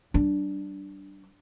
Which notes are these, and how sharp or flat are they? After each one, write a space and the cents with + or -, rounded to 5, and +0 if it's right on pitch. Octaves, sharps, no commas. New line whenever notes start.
G3 -40 D4 +0